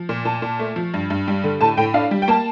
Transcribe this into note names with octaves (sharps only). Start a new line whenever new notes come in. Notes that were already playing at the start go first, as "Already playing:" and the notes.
Already playing: F3
A#2
A#2 A5
A#2
A3
F3
G2
G2
G3
D3
A2 A5
A2 G5
D4 F5
G3
G5
A#3 A5